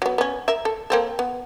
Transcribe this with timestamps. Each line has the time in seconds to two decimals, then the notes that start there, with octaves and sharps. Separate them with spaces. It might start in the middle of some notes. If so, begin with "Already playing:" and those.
0.02 F#3 B3
0.18 B3 C#4
0.48 A#4 E5
0.65 A4
0.90 A#3 C4 A4
1.19 B3